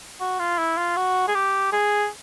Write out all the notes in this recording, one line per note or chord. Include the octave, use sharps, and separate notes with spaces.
F#4
F4
E4
F4
F#4
G#4
G4
G#4